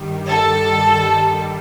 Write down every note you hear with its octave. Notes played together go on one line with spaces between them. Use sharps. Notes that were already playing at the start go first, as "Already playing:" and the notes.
Already playing: G2 D#3 G3
A4